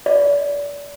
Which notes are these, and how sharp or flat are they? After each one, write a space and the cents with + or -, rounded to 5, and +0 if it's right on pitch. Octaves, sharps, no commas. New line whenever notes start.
D5 -35